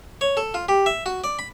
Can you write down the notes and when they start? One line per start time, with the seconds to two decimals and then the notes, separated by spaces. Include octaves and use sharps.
0.21 C#5
0.37 A4
0.54 F4
0.69 G4
0.86 E5
1.06 F#4
1.24 D5
1.39 B5